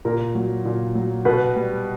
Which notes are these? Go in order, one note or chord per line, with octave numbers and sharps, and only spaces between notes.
A#2 A#4
F#3
A#2
F#3
B2 B4
G3